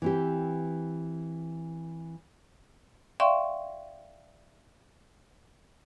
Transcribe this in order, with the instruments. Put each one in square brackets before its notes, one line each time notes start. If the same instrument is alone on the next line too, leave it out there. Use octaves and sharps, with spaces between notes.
[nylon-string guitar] E3 C4 G4
[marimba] D5 E5 F5 G5 C6 C#6